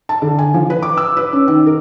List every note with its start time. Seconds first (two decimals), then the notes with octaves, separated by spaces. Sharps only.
0.09 A5
0.22 D3
0.39 G#5
0.54 F3
0.70 B4
0.82 D6
0.97 E6
1.17 B4
1.33 C#4
1.48 D#3
1.67 A#4